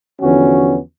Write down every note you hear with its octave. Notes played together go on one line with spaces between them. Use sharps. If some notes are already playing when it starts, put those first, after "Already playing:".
E2 D3 F3 B3 C#4 F#4